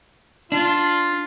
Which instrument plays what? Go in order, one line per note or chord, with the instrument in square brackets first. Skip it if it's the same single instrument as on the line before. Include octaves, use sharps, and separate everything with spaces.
[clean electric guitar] D4 [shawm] F4